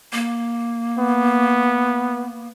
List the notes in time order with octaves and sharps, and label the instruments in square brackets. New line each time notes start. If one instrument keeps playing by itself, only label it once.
[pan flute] A#3
[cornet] B3